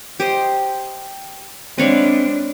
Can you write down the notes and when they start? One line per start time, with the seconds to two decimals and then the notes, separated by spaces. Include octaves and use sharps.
0.20 G4 C5 D#5
1.78 G#3 C4 D4 B4 C#5 F5